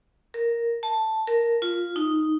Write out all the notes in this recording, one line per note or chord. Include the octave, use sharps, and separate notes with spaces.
A#4
A5
A#4
F4
D#4